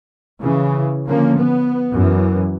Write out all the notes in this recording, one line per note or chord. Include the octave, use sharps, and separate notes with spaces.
C#3 E3
D3 F3 A#3 C#4
B3
F#2 E3